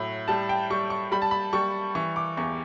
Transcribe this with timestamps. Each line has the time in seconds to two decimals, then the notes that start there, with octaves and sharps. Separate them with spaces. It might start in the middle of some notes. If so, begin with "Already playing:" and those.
Already playing: A2 F#3
0.28 G3 A5
0.49 G5
0.70 G3 C#6
0.90 C#6
1.12 G3 B5
1.22 A5
1.31 B5
1.53 G3 C#6
1.95 E3 C#6
2.16 D6
2.37 E2 C#6